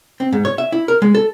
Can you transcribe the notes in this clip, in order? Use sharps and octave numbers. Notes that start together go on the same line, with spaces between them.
C4
G#2
C#5
E5
E4
A#4
G#3
A4